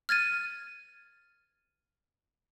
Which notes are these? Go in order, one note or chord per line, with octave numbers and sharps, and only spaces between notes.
F6 G#6 A6 D#7